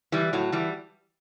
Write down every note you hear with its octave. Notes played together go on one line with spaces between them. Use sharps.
E3 G3
A2 F#3
E3 G3